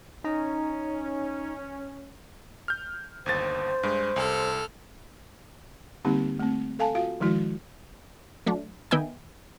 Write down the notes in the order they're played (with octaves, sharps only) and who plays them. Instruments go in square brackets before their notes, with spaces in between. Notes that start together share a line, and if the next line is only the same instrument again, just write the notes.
[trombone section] C#4 [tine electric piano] D#4 D#5 A#5
[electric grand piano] F6 G6
[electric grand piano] G1 D#2 A6 [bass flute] C5
[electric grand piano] G2 G#3
[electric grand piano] C2 [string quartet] A4 F6
[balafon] D3 G3 A#3 C4 D#4 G4
A3 C4
A4 F5 G#5 A5
F4 F#4 F5
D#3 F3 G#3 E4 F#4
[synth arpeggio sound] F#3 A3 D4
D#3 B3 D#5 E5 G5 G#5